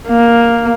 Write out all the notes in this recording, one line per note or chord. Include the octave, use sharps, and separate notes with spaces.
A#3